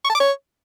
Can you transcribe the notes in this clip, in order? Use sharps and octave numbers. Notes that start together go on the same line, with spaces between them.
C#6
A5
D6
C#5